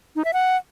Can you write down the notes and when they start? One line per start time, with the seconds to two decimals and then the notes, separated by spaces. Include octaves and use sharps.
0.16 D#4
0.25 E5
0.33 F#5